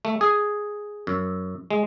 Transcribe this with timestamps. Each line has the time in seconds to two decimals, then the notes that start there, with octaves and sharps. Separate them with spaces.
0.05 A3
0.21 G#4
1.07 F#2
1.70 G#3